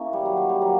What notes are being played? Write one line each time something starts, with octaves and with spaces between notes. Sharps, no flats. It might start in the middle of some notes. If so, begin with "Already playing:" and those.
Already playing: A#3 C#4 E4
G3
F#3
G3
G3
F#3 A#3